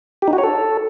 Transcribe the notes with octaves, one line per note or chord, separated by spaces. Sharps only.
G4
D#4
F#4
C#5
A4